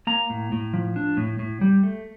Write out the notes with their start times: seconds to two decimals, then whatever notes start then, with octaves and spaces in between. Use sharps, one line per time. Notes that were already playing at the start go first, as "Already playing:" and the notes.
0.07 A#3 A#5
0.30 A2
0.52 A2
0.74 F3
0.96 D4
1.17 A2
1.39 A2
1.61 G3
1.83 A3